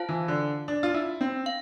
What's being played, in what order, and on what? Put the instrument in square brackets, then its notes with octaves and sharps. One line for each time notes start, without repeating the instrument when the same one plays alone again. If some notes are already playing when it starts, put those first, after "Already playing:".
Already playing: [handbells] F4 C5 F5 A5
[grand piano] E3
D3
D4
F4
E4
C4
[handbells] F5